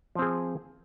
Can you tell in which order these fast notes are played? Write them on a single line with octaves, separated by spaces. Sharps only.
F3 C4 G#4